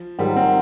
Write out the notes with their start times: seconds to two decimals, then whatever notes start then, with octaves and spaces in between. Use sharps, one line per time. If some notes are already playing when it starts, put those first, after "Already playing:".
Already playing: F3
0.19 G#2 D#3 F#3 G3
0.36 C4